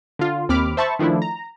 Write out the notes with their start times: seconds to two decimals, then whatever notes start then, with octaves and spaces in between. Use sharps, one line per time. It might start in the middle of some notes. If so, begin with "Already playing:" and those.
0.19 D3 F4
0.49 D#2 C4 B5 D6 F6
0.77 C5 E5 A5 B5 C#6
0.99 D#3 F3 A3 D4 E4
1.22 A#5